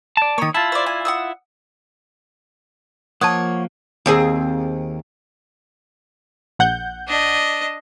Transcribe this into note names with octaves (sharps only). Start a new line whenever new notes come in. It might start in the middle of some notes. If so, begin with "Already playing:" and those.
D5 A5
D#3 A#3 C#5 D#6
E4 F4 A5
C5 D5
G#5
F#5 D#6 E6
F3 A#3 C#5 F#5 A5 D#6
D#2 C4 G#4
A#1 F#5 G6
D4 D#5